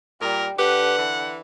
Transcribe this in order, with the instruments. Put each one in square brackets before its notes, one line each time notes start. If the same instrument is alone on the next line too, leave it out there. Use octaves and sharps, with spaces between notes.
[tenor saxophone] A#2 [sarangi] G3 [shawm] A#4
[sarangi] D3 [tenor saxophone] G4 [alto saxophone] B4 [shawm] F#5
[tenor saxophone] E3